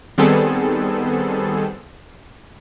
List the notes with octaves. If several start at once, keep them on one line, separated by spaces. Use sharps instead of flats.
D#3 G3 B3 C4 G#4 A4